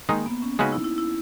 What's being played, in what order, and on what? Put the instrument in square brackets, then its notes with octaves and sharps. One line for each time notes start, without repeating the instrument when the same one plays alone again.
[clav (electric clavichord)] D#3 G#3 D#4 [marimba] A#3
[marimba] B3
C#4
[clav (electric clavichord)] C#3 G#3 C#4 F#4 B4 [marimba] D#4
[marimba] E4
E4
E4